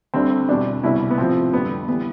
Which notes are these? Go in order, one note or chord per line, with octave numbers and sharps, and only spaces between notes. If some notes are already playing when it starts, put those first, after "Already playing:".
D2 D3 G3 C4
E2 B2 G3 D4
C2 B2 G3 E4
B3
A2 F3 C4
F2 D3 G3 B3
E3 G3 B3